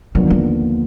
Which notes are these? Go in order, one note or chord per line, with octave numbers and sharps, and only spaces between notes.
D#2 D3 F3 F#3 B3
A#3